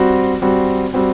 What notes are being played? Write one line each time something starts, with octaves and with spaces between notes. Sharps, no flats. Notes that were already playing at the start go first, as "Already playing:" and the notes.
Already playing: G3 C4 F#4
G3 C4 F#4
G3 C4 F#4